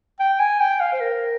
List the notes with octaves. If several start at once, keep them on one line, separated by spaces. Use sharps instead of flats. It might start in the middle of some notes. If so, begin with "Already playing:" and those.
G5
G#5
G5
F5
C5
A#4